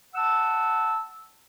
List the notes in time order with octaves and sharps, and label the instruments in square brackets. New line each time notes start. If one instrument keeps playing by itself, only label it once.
[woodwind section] F#5 A5 E6